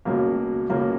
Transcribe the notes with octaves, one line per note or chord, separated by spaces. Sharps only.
C#2 B2 A#3
C#2 B2 A#3